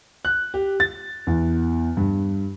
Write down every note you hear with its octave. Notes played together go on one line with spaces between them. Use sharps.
F#6
G4
A6
E2
G2